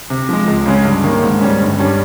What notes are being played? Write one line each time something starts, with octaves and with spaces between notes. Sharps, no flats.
C3
F3 G#3
C#2
C#3 G#3 C#4
G2
D#3 A#3
G#2
G3 C#4
G1
G2 G3 C#4